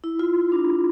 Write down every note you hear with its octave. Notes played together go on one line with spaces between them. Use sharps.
E4
F4
D4